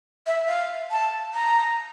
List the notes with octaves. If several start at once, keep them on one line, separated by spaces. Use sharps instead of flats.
E5
F5
A5
A#5